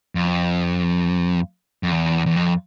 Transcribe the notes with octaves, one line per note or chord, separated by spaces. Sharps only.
F2
F2
E2
E2
F2